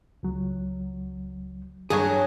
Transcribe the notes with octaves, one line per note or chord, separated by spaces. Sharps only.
C#2 F#3
G2 F#3 G#4 C#5